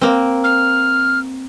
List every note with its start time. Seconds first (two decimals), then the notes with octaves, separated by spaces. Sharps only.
0.01 A#3 C4
0.44 F6